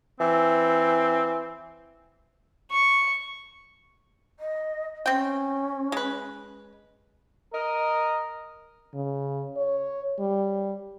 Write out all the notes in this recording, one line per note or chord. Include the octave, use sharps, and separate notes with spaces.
E3 C4
C#6
D#5
C4 C#4 G5
G#3 B4
A#4 D#5
C#3
C#5
G3